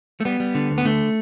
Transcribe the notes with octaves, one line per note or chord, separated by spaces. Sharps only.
A3
G3 B3
G3
D3
D2
B3
D3 A3